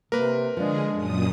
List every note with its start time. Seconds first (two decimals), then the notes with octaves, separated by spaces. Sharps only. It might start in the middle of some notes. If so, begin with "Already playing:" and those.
0.12 C3 A#3 A#4 B4
0.57 D3 F3 G#3 D4 G#4
0.91 F#2 A#2 D#6